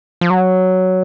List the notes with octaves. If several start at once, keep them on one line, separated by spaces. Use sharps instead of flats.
F3
F#3